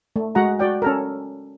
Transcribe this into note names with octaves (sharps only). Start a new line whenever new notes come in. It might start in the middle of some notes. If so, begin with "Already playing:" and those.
A3
G#3 F#4 F#5 A#5
F#4 D5 G5
C#4 A4 A#4